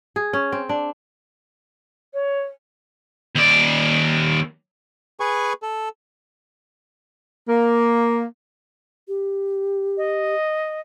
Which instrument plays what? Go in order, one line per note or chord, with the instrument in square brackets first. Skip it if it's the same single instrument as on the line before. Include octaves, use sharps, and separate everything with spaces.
[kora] G#4
C#4
C4
D4
[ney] C#5
[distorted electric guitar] D#2 D5
[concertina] G#4 B4 G#5 C#6
A4
[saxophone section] A#3
[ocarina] G4
[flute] D#5